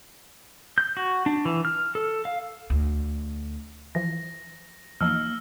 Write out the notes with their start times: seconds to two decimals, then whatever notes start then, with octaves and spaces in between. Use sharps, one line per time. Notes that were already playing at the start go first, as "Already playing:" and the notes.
0.78 G6
0.97 F#4
1.26 D4
1.45 E3
1.65 F6
1.95 A4
2.25 F5
2.70 D2
3.95 E3 F3 A#6
5.01 E2 F3 A#3 D#4 E6 F6